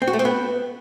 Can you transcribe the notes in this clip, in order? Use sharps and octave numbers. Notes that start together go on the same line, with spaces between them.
C4
F#4
A3
C4
B3